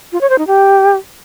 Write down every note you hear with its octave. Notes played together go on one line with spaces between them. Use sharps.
F4
C#5
C5
D#4
G4